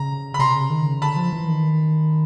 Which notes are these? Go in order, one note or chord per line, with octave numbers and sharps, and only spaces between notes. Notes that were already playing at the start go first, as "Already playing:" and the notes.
Already playing: C#3 A#5
B5
C3 A#5 C6
C#3
D#3
C#3
D3 A5 B5
F3
E3
D#3